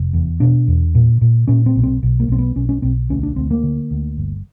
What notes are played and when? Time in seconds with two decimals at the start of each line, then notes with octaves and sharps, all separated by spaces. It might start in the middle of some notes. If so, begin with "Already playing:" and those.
Already playing: F1
0.13 E2
0.40 B2 D4
0.68 E2
0.95 A#2
1.21 A#2
1.48 A#2 C#4
1.66 C4
1.76 B1
1.83 C4
2.03 B1
2.20 A#3
2.28 B1 C4
2.39 B3
2.56 B1 C#4
2.69 C#4
2.82 B1 C4
3.09 D2 C#4
3.23 D4
3.36 D2 C4
3.51 A#3
3.63 D3
3.91 D2
4.17 G1